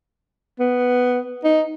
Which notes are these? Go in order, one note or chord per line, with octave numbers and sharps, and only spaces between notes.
B3
D#4